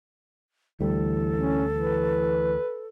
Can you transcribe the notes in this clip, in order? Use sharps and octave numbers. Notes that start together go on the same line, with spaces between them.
D2 E3 G3 A4
C#4
E3 B4